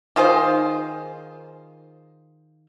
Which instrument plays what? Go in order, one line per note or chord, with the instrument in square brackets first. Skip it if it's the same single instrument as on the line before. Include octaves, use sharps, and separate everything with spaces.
[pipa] D#3 F4 G#4 C5